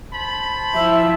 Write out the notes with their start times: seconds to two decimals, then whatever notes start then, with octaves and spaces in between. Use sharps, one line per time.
0.12 C5 A5 B5
0.74 F3 E4 E5